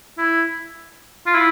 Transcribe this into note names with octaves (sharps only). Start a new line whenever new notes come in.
E4
F4
E4